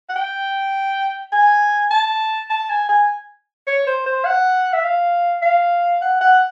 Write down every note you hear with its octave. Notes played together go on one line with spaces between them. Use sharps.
F#5
G5
G#5
A5
A5
G#5
G#5
C#5
C5
C5
F#5
E5
F5
F5
F#5
F#5